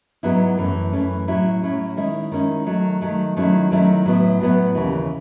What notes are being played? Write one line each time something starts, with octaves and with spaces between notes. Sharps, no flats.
G#2 F#3 B3 E4
F#2 E3 A3 C#4
F#2 E3 A3 C#4
A2 F#3 C#4 E4
A2 F#3 C#4 E4
D#3 G#3 C#4 E4
D#3 G#3 C#4 E4
D#3 F#3 A3
D#3 F#3 A3
D#3 F#3 A3 C#4 E4
D#3 F#3 A3 C#4 E4
A2 F#3 B3 E4
A2 F#3 B3 E4
D#2 C#3 E3